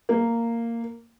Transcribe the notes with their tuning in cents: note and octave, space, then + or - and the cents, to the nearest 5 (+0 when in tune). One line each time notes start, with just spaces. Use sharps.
A#3 -10